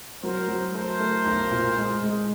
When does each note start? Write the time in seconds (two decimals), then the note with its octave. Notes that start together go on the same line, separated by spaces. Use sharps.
0.23 F#3 A#4 C5
0.48 F#3
0.74 A3 A#4 C5
0.99 A3
1.25 B1
1.51 A#2
1.76 G#3
2.03 G#3